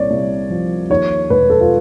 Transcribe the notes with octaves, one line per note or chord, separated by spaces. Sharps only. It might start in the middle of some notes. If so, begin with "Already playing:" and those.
Already playing: C2 A#2 C#5 D5
C2
F3
D#2 C#5
E1 B4
A4
F4